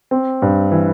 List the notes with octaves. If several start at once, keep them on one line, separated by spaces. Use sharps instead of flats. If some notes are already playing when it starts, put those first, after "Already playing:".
C4
G2
E3